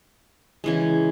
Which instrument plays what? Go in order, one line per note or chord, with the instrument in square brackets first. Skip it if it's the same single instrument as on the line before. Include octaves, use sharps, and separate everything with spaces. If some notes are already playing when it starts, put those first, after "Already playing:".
[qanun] C#3 E3 G#3